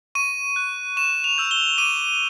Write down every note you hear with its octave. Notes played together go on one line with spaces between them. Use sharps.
C#6 D#7
F#6
C#6 E7
F7
E6 G6
G7
D6 D#7